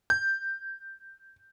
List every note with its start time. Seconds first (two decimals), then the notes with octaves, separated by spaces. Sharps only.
0.10 G6